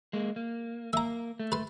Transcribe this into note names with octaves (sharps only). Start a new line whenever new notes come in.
G#3 A#3
A#3
A#3 E5 A#5
A3
B4 C6